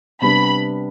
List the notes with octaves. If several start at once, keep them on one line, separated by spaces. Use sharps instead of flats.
C3 G3 B3 D4 B5